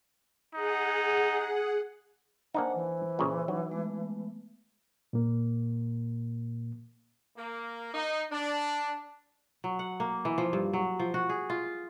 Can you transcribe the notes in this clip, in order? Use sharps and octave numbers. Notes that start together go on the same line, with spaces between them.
D#4 G#4 F#5
A#3 D4 D#4 C5 F#5 G#5
E3
A#2 C#3
F#3 D#4
G#3 A3 B3
A#2 A#3
A#3
D#4
D4
F#3
F#5
A#3
E3
F3
G2
F#3
F3
F#4
G#4
F4